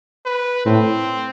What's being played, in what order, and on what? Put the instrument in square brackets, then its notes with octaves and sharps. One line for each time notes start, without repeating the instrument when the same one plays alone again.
[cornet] B4
[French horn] A2 [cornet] C4